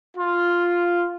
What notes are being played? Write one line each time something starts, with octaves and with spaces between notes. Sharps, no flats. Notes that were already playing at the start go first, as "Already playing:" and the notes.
F4